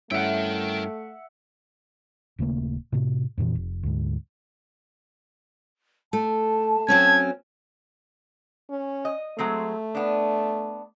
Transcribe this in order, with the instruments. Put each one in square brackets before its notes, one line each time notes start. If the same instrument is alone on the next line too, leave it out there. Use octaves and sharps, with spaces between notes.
[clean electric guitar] G2 C#4 E4 [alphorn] A3 [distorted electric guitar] A#4 G5 [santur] E5 F#5
[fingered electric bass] D#1 C#3 A3 A#3
A2 C3
F2 A#2 D3 E3
F1
D2 G#2
[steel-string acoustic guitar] A3 [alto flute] A5
[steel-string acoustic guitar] F#3 C4 C#4 [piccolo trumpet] G#6
[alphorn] C#4
[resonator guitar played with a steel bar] D#5
[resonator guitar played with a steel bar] F#3 G#3 C4 [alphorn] A3
[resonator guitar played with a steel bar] B3 D4